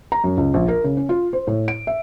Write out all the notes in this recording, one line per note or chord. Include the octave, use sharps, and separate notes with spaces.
A#5
F#2
C#2
A#1
A#4
C#3
C#4
F4
C5
A2
D7
E5